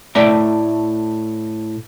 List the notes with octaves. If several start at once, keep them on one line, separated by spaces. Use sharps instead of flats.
A2 A3 D5 E5 G5 A#5